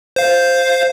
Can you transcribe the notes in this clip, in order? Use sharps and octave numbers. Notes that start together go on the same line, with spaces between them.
C5 F5